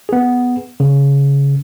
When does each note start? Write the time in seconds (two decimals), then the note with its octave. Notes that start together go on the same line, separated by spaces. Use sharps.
0.09 B3 G#4
0.80 C#3